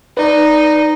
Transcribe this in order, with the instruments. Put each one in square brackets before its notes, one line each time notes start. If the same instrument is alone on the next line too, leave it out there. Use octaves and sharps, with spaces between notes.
[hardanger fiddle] D#4 [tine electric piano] B4 D5